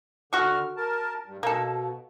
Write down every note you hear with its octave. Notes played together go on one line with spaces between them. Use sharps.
D3 F#4 C#6 F6
A#4 A5
G2
B2 A#3 A4